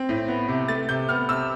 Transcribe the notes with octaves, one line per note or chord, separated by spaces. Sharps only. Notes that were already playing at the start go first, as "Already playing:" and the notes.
Already playing: C4
A2
B3
C3
A3 A6
C3 G6
B3 F6
C3 E6